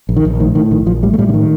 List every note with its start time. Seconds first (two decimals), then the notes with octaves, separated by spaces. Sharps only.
0.09 A#1
0.16 D#3
0.25 A#1
0.40 A2 D#3
0.55 A2 D#3
0.71 A#1 D#3
0.87 A#1 F3
1.03 A2 G3
1.14 A3
1.18 A2 G3
1.29 D3
1.34 D#3